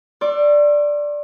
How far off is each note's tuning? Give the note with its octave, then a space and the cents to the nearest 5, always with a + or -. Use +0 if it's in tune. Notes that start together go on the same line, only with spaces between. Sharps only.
D5 +0 C6 +45 E6 +40